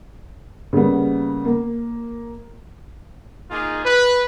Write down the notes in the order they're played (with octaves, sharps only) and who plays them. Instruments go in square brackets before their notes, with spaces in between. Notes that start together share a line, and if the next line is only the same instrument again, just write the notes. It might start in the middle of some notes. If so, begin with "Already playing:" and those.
[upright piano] C#3 G3 A#3 B3
A#3
[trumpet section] A#3 D#4 F4 G#4
B4